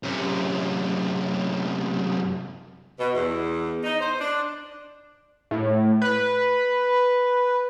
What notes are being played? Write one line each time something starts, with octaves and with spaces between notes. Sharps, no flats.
F#2 C3
B2
E2
D#4
C5
D4
A2
B4